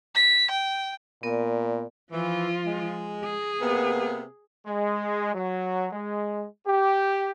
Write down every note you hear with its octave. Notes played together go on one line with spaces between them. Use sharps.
B6
G5
A#2 B3 A#4 D5
E3 F3 F4
G#3
G#4
C3 A#3 B3
G#3
F#3
G#3
G4